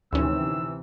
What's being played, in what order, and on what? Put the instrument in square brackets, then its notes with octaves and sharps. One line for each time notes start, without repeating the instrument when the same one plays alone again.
[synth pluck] D2 C#4 [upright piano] G#2 D#3 [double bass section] C3 E3 [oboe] E6